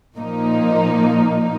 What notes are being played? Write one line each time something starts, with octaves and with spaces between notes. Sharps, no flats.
A#2 F3 A#3 D#4